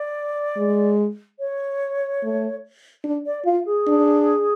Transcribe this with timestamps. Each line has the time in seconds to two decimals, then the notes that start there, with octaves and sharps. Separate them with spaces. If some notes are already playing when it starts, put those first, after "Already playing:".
Already playing: D5
0.57 G#3
1.40 C#5
2.23 A3
3.04 D4
3.26 D5
3.46 F4 F5
3.66 G#4
3.88 D4